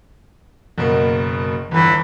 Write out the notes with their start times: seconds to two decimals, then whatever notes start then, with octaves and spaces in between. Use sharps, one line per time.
0.78 F#1 B2 A#3
1.71 G1 E2 E3